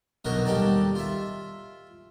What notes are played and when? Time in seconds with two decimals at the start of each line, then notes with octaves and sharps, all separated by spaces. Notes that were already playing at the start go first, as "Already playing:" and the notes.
0.25 B2 D3 F#3 B3 D#4 A#4
0.45 D#2 G3 D#4 G4 A4 D5
0.95 F4 E5